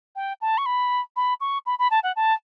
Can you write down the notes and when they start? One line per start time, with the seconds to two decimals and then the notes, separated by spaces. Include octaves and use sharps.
0.16 G5
0.41 A5
0.58 C#6
0.66 B5
1.16 B5
1.41 C#6
1.66 B5
1.79 B5
1.91 A5
2.03 F#5
2.16 A5